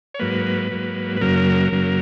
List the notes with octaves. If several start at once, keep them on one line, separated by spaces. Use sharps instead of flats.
C#5
G#2 F#3 A#3 B4
G#2 F#3 A#3
B4
F#2 C#3 F#3 A#3 A#4
F#2 C#3 F#3 A#3